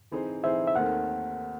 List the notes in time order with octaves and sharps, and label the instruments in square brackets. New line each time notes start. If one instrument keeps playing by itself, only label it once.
[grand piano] E3 C4 D#4 G#4 C5
[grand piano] E3 C4 D#4 G#4 C5 [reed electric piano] E5
[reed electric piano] E5
[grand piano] D#2 D#3 A3 C4 [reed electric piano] F#5